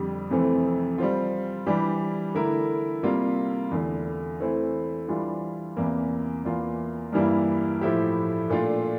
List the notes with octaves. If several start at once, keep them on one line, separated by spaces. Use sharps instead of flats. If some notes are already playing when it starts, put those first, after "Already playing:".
Already playing: F2 D3 G3 D4 G4
F2 C3 E3 A3 C4
G3 C4 F4
E3 G3 D4 G4
D3 A3 E4 A#4
C3 G3 A#3 F4
E2 D3 A3
E3 A3 C4 E4
E3 G3 D4 F4
E2 C3 E3 A#3
E2 E3 A#3 F4
G2 E3 G3 A#3 E4
A2 F3 A3 E4 G4
A#2 A3 D4 F4